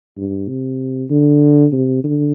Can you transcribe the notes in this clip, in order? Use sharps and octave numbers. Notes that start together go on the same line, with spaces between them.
G2
C3
D3
C3
D3